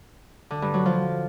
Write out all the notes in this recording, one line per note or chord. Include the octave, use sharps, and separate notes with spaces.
D3
G2
F#3
F3